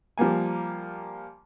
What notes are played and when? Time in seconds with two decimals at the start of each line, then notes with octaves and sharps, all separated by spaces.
0.18 F3 G3 A#3 G#5